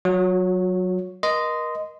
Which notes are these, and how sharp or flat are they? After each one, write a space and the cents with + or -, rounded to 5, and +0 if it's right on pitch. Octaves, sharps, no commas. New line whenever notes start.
F#3 +0 F#4 -35 C#5 +0
A#4 +35 D#5 +0 C6 -20